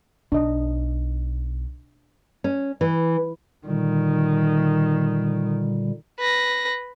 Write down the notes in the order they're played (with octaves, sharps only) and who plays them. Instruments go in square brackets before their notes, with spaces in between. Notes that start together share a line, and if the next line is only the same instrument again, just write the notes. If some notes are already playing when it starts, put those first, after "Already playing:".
[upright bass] B1 [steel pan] D4 D#5
[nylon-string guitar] C#4
E3
[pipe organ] A#2 D3 G3 [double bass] D#3
[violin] B4 A#6